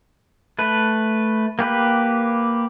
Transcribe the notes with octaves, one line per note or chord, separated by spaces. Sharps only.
A3 B4
A#3 G4 B4